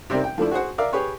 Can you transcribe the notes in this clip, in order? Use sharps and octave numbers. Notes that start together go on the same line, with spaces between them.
C3 G3 C4 D#4 A#4
G5
F3 A3 D4 E4
F#4 G#4 C5 F#5
A#4 D5 E5 F5
G4 G#4 B4 C#5